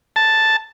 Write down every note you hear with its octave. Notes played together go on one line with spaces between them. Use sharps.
A5